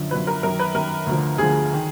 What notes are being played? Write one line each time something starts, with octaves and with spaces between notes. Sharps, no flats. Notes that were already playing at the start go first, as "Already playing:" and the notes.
Already playing: F#2 D3 F3
F#2 D3 F3 B4
A#4
F#2 D#3 A#4
B4
F#2 D#3 A#4
D2 D3 F3
D2 D3 F3 G#4
D#3